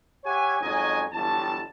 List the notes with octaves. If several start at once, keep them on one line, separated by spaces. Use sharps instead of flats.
G4 C#5 E5 F#5 G#5
F2 G#2 F#3 C#4 D#5 G#5
G1 E2 F#3 G3 A5